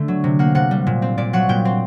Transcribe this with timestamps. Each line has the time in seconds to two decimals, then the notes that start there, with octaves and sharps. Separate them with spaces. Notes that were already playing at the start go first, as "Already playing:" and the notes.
Already playing: D3 A3
0.08 F#3
0.24 C3
0.39 A#3 F#5
0.55 C3 F#5
0.71 G3
0.87 A#2
1.02 C4
1.18 A#2 D5
1.33 F#3 F#5
1.49 A#2 G5
1.65 C4